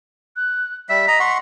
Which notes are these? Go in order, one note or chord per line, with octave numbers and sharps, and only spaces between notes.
F#6
G3 E5 B6
D#5 A#5
F#5 C6 C#6